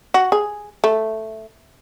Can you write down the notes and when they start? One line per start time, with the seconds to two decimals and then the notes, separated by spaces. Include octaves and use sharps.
0.14 F#4
0.32 G#4
0.84 A3